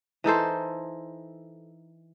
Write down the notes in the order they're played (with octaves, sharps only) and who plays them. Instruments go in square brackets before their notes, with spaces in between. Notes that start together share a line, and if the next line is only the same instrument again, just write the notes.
[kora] E3 D#4 A4 C5